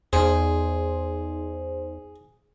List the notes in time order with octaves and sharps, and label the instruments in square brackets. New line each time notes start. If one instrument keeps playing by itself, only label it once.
[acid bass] E2 [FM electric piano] D#4 C5 [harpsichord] G#4